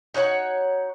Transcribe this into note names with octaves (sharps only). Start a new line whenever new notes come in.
D#4 F#4 C#5 F#5